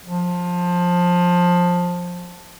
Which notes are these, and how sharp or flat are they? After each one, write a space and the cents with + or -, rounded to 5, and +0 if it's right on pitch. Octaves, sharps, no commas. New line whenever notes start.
F3 +20